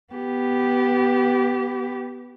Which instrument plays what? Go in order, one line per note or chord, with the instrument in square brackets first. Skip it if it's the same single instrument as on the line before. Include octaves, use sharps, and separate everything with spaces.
[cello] B3 G4